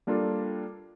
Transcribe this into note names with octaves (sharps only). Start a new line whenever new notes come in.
G3 A#3 D4 F4 A4